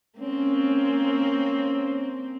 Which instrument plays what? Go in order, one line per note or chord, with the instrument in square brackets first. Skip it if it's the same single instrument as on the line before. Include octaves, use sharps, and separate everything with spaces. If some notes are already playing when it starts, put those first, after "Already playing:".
[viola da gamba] A#3 C4 [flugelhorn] C#4